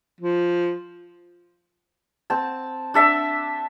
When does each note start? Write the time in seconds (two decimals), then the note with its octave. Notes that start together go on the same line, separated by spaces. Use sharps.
0.21 F3
2.30 C4 A5
2.94 D4 A4 E5 A5